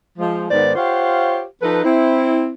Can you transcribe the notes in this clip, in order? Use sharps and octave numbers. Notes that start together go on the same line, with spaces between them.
F3 G#3
G#2 D#3 B3 C5 D5
F4 G4 C5 C#5 F5 F#5
F3 D#4 A4 B4
C4 E4